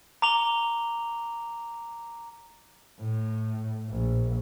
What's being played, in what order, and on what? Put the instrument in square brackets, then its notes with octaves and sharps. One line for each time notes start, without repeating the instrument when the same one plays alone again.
[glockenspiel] A#5 D6 F7 G7
[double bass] A2
A#1